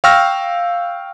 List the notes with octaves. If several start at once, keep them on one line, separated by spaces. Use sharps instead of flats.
F5 G5 C#6 E6 F6 A#6